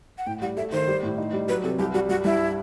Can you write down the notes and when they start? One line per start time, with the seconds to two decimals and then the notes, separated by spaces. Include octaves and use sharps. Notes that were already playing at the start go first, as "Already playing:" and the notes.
0.18 F#5
0.27 A2 G5
0.42 G3 F#5
0.57 A3 E5
0.72 D#3 C5
0.87 G3
1.03 A2
1.18 D#4
1.33 G3
1.48 F#3 B4
1.64 C3 A4
1.79 C2 G4
1.94 G3 F#4
2.09 G2 F#4
2.25 G2 E4